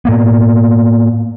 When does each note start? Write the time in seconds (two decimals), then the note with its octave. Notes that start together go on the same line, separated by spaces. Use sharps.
0.05 A2 A#3 B3